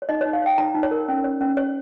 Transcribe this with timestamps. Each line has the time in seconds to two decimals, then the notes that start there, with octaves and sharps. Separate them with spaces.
0.02 C#5
0.09 D#4 D#5
0.21 C#5
0.26 D#4
0.33 F5
0.42 C#5 G5
0.58 D#4 A#5
0.74 D#4
0.83 C#5
0.91 A#4
1.08 C#4
1.24 C#5
1.41 C#4
1.57 C#5